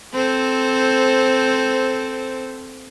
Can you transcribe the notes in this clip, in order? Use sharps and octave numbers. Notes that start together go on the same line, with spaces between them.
C4 A4 C5